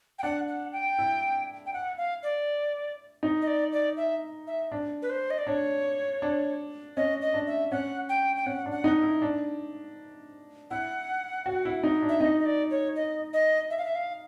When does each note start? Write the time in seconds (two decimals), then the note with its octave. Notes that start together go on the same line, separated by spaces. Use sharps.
0.19 G5
0.23 D4 F#5
0.48 F#5
0.72 G5
0.98 E4
1.66 G5
1.73 F#5
1.97 F5
2.23 D5
3.23 D#4
3.42 D#5
3.47 D5
3.72 D5
3.97 E5
4.47 E5
4.72 D4
5.02 B4
5.10 C5
5.30 D#5
5.38 D5
5.47 D4 C#5
6.22 D4
6.97 C#4 D#5
7.21 D#5
7.34 D4
7.47 E5
7.71 C#4 F#5
8.09 G5
8.36 G5
8.46 C#4 F#5
8.66 D4
8.72 F#5
8.84 D#4
9.02 E4
9.22 D4
10.71 E4 F#5
11.46 F#4
11.65 E4
11.84 D#4
12.02 D4
12.09 E5
12.20 D#4 D#5
12.39 D#5
12.46 D5
12.71 C#5
12.96 D#5
13.33 D#5
13.70 E5
13.78 F5
13.85 E5
13.95 F5